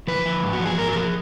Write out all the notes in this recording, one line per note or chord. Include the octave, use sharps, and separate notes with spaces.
F3 B4
F3
G#2
F#4
F3
G#4
G#2 A#4
F#4
F3 G#4